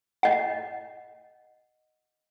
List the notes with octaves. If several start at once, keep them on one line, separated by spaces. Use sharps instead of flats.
D#5 F#5